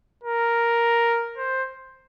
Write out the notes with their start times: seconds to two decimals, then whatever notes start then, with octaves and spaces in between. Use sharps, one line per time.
0.24 A#4
1.37 C5